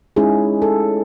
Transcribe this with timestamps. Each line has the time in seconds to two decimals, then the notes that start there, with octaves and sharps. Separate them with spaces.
0.16 G#3 C#4 D#4 E4 G#4
0.62 A4